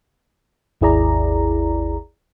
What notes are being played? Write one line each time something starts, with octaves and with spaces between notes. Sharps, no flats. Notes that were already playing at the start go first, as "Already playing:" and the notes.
G#1 D#2 E4 G#4 D5 A#5